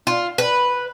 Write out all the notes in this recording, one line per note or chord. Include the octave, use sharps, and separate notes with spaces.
F4
B4